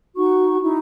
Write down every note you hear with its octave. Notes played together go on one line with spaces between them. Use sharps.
D#4 F#4 C#6
D#4 E4